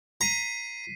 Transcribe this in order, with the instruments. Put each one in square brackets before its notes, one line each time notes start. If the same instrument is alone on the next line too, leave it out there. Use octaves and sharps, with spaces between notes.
[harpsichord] A#5 [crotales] B6 C7 D#7